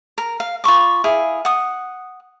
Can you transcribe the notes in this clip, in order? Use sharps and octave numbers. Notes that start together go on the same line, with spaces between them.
A#4
F5
F4 B5 C#6 D6
E4 G#4 F5
F#5 D#6